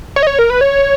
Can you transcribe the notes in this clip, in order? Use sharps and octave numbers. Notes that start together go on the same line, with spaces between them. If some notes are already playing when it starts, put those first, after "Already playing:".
C#5
D#5
C#5
A#4
B4
C#5